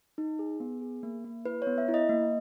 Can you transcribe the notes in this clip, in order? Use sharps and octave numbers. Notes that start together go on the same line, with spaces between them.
D#4
G#4
B3
G#4
A#3
A#3
E4 B4
C#5
B3
E5
E4
D#5
A#3